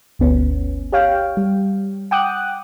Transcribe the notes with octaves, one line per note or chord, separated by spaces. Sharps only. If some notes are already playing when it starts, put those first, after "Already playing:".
G1 D2 B3 C#4
G4 C#5 F5 G5
G3
F#5 G5 D6 D#6 F#6